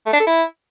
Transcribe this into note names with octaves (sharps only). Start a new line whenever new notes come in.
A3
D4
A4
E4